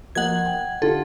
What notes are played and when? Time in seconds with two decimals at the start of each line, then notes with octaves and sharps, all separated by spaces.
0.15 F3 A#3 D#5 F#5 G#6
0.46 G5
0.82 D3 F4 G4 A4